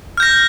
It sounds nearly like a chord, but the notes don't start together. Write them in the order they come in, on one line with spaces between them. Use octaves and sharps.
F6 G6 A#6